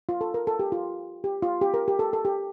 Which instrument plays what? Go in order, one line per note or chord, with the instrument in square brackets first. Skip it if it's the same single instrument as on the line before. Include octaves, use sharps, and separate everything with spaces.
[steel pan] F4
A4
A#4
A4
G4
F4
G4
F4
G4
A#4
G4
A4
A4
G4